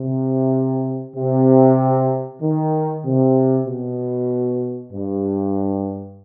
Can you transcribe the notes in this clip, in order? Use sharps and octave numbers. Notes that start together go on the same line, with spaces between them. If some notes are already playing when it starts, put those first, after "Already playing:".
Already playing: C3
C3
D#3
C3
B2
G2